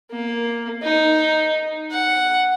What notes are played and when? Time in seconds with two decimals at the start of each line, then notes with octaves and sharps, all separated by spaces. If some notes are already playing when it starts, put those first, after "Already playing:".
0.11 A#3
0.83 D#4
1.92 F#5